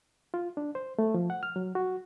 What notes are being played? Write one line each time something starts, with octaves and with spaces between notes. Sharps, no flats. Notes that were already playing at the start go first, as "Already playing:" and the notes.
F4
D4
C5
A3
F3
F#5
F6
F#3
F#4